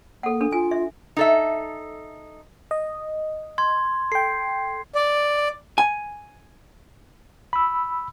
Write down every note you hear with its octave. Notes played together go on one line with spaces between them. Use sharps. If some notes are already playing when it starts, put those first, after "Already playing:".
A#3 A4 F#5
D4 A4
F4 G#5
E5
D#4 A4 E5
D#5
C6 G#6
A4 G5 C7
D5
G#5
B5 E6